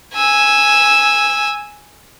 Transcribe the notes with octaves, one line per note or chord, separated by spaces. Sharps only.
G#5 E6